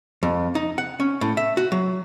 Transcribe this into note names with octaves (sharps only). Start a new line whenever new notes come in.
F2
D#4
F#5
C#4
A2
E5
F#4
F#3